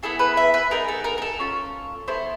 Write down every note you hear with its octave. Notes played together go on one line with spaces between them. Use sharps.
B3 E4 G#4 A4
B4
E5
B4
B3 D#4 G#4 A#4
A4
A#4
A#4
A4
C#4 F4 A4
B3 E4 A4 C5